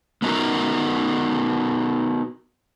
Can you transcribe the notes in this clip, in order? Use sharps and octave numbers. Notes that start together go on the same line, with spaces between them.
B3 D4 D#4 F4 F#4 A#4